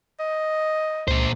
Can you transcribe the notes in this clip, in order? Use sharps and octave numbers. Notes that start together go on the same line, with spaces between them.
D#5
C#2 A#2 C5